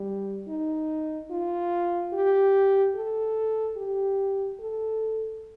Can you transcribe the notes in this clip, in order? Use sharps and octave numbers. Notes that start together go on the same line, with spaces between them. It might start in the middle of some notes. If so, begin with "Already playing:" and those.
Already playing: G3
D#4
F4
G4
A4
G4
A4